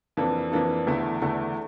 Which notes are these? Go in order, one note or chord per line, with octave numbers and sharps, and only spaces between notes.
F2 E3 A#3 D4 A4
F2 E3 A#3 D4 A4
E2 D3 A3 E4
E2 D3 A3 E4